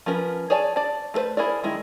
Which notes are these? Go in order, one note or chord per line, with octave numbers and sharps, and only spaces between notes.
F3 C#4 A#4 B4
G#4 C#5 D5 G#5 A5
D5 A5
A3 A4 B4 C5
E4 G#4 A#4 D5
D#3 G#3 E4